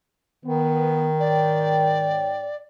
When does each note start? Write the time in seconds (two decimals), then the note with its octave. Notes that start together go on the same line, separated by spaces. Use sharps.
0.45 D#3 B3
1.20 G#2 C#5 D5 G5